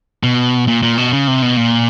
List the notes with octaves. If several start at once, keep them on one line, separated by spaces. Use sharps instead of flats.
B2
A#2
A#2
B2
C#3
C3
B2
A#2